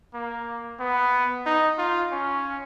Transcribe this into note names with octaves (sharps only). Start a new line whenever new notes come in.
A#3
B3
D#4
F4
C#4